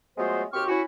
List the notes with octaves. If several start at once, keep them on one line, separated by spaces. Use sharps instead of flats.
F#3 G#3 A3 B3 F4 C5
D#2 C4 F#4 G4 C#6 F6
C#4 E4 F#4